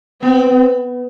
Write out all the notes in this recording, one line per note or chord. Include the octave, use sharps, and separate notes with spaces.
B3 C4